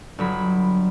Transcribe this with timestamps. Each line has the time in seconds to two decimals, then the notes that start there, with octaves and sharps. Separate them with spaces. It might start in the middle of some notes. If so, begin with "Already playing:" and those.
0.18 G1 F#3 B5